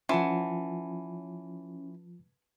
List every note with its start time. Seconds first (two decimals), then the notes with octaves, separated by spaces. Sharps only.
0.09 E3 F3 C#4 F4 F#5 A5 C6